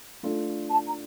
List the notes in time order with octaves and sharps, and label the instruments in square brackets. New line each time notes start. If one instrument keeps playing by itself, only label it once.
[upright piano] A3 D4 F4 A4
[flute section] A5
A#5